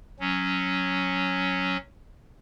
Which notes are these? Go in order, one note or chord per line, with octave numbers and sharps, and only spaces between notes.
F#3 C#4